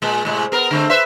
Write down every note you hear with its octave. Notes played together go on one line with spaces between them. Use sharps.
A#2 G#3
A2 C3 G#3
B3 A#4
D3 A3 C4
B4 C5 E5